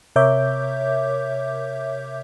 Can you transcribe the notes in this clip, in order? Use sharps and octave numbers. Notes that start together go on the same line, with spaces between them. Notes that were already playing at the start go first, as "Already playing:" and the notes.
C3 A#4 C#5 E5 D6 G6